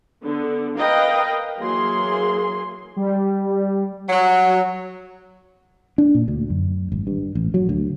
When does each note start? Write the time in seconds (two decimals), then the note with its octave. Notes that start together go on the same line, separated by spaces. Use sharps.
0.23 D3 B3
0.78 A#4 B4 D#5 F5 G5
1.59 E3 F#3 A#3 G#4 C6
2.96 G3
4.09 F#3
5.98 D4
6.15 A#2
6.28 D2
6.50 F#2
6.92 G#1
7.07 G2
7.35 A1
7.54 F#3
7.69 D2